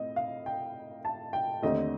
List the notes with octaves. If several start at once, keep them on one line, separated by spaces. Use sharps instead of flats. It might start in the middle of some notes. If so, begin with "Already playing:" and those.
Already playing: A2 C4 D#5
F5
G5
A5
G5
D#2 D3 A3 C4 D#5